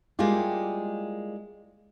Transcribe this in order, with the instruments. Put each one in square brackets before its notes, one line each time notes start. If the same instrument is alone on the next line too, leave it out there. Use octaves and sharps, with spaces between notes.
[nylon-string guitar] G3 G#3 A#3 E4 F4 G4